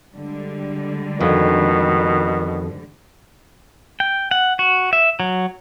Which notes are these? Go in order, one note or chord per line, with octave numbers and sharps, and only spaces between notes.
D3 G3 G#3
F2 B2 D#3
G5
F#5
F#4
E5
F#3